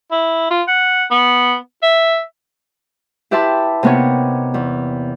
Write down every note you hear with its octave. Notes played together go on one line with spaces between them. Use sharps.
E4
F4
F#5
B3
E5
E4 G4 B4 E5 A5 C6
C3 A#3 B3 D#4 C#5
E2